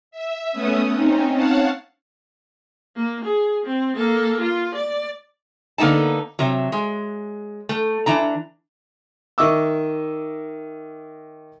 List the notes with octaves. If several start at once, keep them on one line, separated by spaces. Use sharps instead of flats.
E5
A3 B3 C#4 D#6
C4 C#4 D#4
C#5 F5 F#5 A5
A#3
G#4
C4
A#3 A4
F4
D5
D3 A#3 B3 D#4 A5
C3 F#3
G#3
A3
E3 D4 A#5
D#3 D#5 E5 C#6 D6 E6